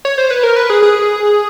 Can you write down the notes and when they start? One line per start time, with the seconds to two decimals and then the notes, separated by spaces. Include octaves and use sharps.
0.05 C#5
0.18 C5
0.31 B4
0.43 A#4
0.56 B4
0.70 G#4
0.82 G#4